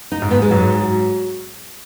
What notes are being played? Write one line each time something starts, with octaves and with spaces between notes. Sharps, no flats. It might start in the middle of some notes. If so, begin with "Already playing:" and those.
D#4
G#2
B3
G#3
G#2 F#3
F#3